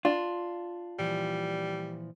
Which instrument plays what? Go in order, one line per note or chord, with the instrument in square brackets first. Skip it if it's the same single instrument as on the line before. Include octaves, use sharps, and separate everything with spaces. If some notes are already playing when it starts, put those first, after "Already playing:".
[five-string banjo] D4 [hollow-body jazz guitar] F4
[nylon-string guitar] A#2 E3 F3 [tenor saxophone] G3